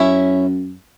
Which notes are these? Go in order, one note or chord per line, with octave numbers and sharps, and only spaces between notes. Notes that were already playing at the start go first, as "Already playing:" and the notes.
Already playing: F#2 C#4 E4